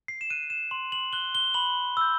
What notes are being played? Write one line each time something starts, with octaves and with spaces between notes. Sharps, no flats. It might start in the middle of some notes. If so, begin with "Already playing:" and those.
C7
E7
F#6 D#7
E7
C6 F#7
F#7
F#6 G7
G7
B5 F#7
E6 G6